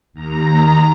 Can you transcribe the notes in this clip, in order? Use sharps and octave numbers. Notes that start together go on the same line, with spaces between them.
D#2 A#5